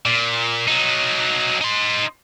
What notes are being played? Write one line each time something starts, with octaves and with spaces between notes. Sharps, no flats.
A#2
F#3 D#4
D#4 C6